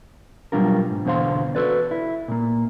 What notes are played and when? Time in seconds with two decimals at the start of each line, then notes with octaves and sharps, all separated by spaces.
0.52 B2 F#3 G3 D4 F4 A#4
0.90 G#2
1.05 E2 B2 D3 C5 F5 C6
1.55 F#4 A4 B4 D5
1.91 E4
2.28 A#2 A#3